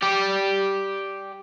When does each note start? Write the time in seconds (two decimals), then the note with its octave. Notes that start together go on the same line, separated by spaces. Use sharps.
0.03 G4 D5